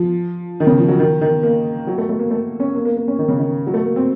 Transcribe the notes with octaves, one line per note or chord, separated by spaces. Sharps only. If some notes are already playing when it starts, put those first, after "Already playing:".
Already playing: F3
D#3
C#3
F3
F#3
D#3
D#3
A#3
F#3
A3
A3
A#3
A3
C#4
A#3
A#3
A#3
C#4
D#3
C#3
D#3
F#3
A3
A#3
C4